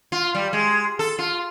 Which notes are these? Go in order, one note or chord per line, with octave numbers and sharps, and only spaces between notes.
F4
G3
G#3
A4
F4